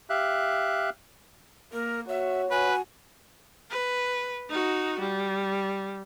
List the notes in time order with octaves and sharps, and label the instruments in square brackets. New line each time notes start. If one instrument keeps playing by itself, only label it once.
[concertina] G4 E5 F5 F#6
[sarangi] A#3 [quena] A#4
[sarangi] F#4 [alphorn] C#5 [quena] E5
[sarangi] F#4 [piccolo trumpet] B4 [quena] G#5
[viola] B4
D#4 F#4
G3